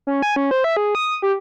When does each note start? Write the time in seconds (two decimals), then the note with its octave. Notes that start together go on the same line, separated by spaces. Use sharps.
0.07 C#4
0.22 G#5
0.36 C#4
0.51 C5
0.64 E5
0.77 G#4
0.95 D#6
1.22 G4